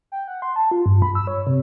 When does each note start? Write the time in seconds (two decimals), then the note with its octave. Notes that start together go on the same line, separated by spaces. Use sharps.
0.12 G5
0.28 F#5
0.42 C6
0.56 A5
0.71 F4
0.86 G2
1.02 B5
1.15 E6
1.27 C#5
1.47 C3